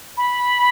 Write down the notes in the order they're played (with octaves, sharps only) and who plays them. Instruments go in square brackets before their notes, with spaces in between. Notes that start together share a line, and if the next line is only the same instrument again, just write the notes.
[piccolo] B5